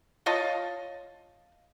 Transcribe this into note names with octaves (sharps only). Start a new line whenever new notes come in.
F4 C#5 D#5 A5